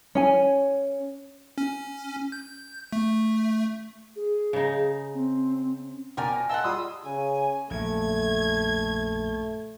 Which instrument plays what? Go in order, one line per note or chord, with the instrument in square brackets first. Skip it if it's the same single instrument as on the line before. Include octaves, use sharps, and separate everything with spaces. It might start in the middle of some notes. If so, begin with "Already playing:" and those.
[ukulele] C#4 G#5
[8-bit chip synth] C#4
G6
A3
[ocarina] G#4
[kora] C#3 D#4
[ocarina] C4
[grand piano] B2 [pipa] F3 A#4 D5 [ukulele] C5 G5 G#5
[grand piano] A#6
[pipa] G#3 A#4 F#5 [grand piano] F5 G7 [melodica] A5 E6
[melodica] G3 D#6 E6 [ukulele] F4 G#4 [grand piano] C6
[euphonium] C#3 [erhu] G#5
[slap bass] A#1 F#2 [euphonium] A3 [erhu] G#6